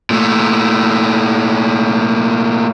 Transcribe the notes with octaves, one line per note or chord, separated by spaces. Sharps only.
A#2 A3